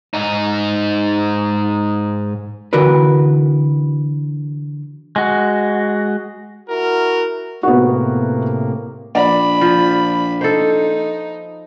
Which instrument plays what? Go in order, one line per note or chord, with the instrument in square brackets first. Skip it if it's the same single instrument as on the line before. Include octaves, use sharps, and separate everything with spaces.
[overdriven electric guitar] G#2 D#4
[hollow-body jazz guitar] D3 E3 F#4 A#4 B4
[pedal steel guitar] G#3 F#4
[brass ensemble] E4 F#4 A#4
[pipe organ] A2 C3 A#3 [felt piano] B3 F#4
[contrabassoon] A#1 [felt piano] D5 [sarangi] B5
[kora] F3
[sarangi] D#4 [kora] A4 C5